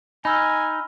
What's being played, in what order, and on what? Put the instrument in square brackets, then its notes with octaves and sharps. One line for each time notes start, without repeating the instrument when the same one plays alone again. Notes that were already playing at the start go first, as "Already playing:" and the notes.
[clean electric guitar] D#4 [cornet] G#5 [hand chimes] B5 E6 F6